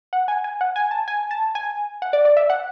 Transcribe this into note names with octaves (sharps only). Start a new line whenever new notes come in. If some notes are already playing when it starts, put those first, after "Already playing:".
F#5
G#5
G#5
F#5
G#5
A5
G#5
A5
G#5
F#5
D5
D5
E5
F#5